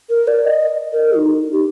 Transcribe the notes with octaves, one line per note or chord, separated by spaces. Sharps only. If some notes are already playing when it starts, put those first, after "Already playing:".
A#4
D5
D#5
A#4
D#4
G4